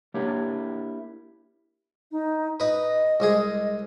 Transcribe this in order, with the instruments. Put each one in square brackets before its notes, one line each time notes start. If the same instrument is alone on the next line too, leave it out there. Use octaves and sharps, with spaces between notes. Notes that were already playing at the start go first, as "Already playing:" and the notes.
[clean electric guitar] A#3 D4 E4 G4 A#4 C#5
[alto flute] D#4
[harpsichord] D#4 B4 [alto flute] D#5
[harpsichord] C2 G#3 G#4